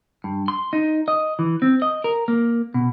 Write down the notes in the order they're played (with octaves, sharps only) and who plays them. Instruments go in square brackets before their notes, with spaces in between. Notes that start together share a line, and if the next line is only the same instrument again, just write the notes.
[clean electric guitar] G2
C6
D#4
D#5
E3
C4
D#5
A#4
A#3
B2